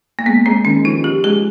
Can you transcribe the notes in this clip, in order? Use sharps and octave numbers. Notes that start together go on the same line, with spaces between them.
A#3
G#3 B3
G#3 C4
D#3 C#4
F3 D#4
F3 G4
G#3 G#4